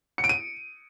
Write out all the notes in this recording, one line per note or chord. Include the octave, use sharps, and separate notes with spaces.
C#7
D7
D#7